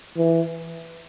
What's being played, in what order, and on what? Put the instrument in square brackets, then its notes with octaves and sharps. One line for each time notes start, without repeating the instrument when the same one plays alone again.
[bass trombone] E3